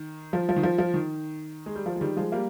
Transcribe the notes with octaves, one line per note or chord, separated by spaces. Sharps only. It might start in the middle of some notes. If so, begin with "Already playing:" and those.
Already playing: D#3
F3
F3
D#3
F3
F3
D#3
G#3
G3
F3
G#3
D#3 G3
F3 G#3
G3 A#3